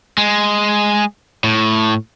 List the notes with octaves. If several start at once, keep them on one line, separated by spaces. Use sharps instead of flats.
G#3
A2